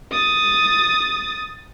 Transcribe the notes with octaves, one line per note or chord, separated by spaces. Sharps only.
D#6 A6